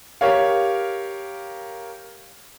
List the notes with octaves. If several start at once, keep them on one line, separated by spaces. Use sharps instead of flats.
G4 A#4 C#5 F5